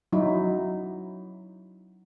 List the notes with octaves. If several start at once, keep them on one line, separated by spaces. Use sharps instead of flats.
F#3 D#4 E4